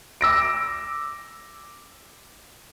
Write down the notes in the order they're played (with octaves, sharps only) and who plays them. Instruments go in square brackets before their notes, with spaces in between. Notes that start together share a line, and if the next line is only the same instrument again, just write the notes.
[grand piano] D6 E6 A#6 D7